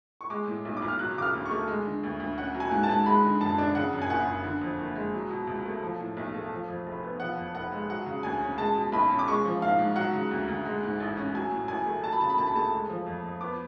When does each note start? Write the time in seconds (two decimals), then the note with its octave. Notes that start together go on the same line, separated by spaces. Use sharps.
0.21 C#6
0.30 G#3 D6
0.47 A2
0.65 B1
0.77 D6
0.82 B1
0.88 F6
0.99 F#3 F#6
1.17 C#3 D6
1.22 F6
1.34 D2
1.46 C#6
1.51 A3
1.68 G#3
1.85 D3
2.03 D2
2.20 D2
2.38 C#4 F#5
2.55 F#3
2.60 G#5
2.71 G#2
2.83 A5
2.89 G#2
3.06 G#3 B5
3.24 D3
3.41 F#2 A5
3.58 D4
3.75 C#3 F#5
3.93 F#2
4.02 G#5
4.09 F#1 F#5
4.27 F#1
4.44 D3
4.61 F2
4.79 F#1
4.95 G#3
5.14 F#3
5.30 B2
5.47 C#2
5.66 A3
5.83 F3
6.00 A2
6.17 B1
6.34 A3
6.52 F3
6.68 F2
6.86 F1
7.03 B3
7.20 F3 F#5
7.37 F2
7.55 F1 F#5
7.72 G#3
7.89 F#3 F#5
8.06 C#3
8.23 D2 G#5
8.41 C#4
8.58 G#3 A5
8.75 B2
8.92 B1 B5
9.10 C#4
9.19 D6
9.27 G#3 C#6
9.45 F3
9.62 G#2 F5
9.79 G#2
9.96 F#3 F#5
10.13 C#3
10.31 D2
10.48 D2
10.65 G#3
10.83 G#2
11.00 A1
11.17 C#4
11.35 F#3 G#5
11.51 A2
11.68 A1 G#5
11.86 A3
12.03 F#3 A5
12.13 B5
12.21 C#3 A5
12.30 B5
12.38 D2 A5
12.47 B5
12.56 A3 A5
12.72 G#3
12.89 F3
13.06 F2
13.25 F2
13.41 B3 D6